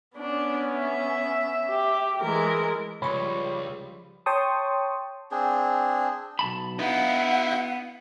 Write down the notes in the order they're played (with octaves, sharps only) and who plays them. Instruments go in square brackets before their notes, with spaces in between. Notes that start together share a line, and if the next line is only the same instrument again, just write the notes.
[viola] B3 C#4 [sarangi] D4
[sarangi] E5
[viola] G4
[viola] E3 G#3 [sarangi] A#4
[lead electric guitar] C#2 [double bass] F3 G3 [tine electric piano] C#5 C#6 [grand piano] B5
[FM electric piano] C#5 G5 A5 C6 C#6 D#6
[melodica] C4 D4 G#4
[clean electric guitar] B1 A5 B5
[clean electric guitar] B3 [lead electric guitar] D#4 E4 [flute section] F5 F#5